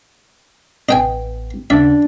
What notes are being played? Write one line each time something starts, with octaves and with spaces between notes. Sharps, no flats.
A1 B3 D#5 G5 G#5
D#2 C#3 D4 E5 F5